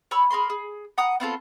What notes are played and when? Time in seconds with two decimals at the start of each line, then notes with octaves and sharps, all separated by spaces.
0.11 C#5 B5 E6
0.30 G#4 A#4 B5 C6
0.50 G#4
0.98 F#5 A#5 D#6
1.20 B3 C4 F4 A4